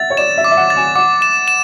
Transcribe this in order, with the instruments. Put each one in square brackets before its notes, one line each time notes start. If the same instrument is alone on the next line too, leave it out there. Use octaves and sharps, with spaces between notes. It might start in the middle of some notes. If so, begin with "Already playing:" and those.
Already playing: [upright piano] E5 F#5 [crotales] A6
[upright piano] C#5
[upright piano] D5 [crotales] E7
[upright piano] E5
[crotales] D6
[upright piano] E5
F#5
[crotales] A6
[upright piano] G#5
[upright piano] F#5 [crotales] D6
[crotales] E7
E7